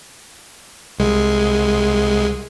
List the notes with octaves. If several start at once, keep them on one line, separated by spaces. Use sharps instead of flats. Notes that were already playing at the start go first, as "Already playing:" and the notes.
C2 G#3